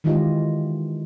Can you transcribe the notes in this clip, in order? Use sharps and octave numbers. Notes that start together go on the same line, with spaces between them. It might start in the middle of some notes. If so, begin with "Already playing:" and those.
D#3 E3 G#3 F4 G4 D#5